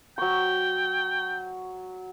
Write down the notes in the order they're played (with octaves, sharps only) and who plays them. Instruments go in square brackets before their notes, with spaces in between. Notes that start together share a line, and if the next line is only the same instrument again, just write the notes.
[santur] F#3 C#6 [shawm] G5